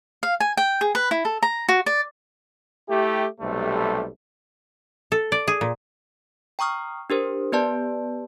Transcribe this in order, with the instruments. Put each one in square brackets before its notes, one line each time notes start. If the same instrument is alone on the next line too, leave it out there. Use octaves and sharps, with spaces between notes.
[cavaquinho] F5
G#5
G5
G#4
B4
E4
A4
A#5
F#4
D5
[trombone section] A3 E4 G4
B1 C3 G3 A3 A4
[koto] A4
D5
G#4
A#2
[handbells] G5 A#5 C#6 D#6 F6
D4 G4 A#4 C5
B3 G4 B4 D5 A5